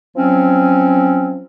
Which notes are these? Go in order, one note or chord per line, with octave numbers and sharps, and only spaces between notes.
F3 F#3 C4 C#4